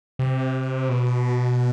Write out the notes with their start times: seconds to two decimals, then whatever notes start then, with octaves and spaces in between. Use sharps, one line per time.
0.19 C3
0.89 B2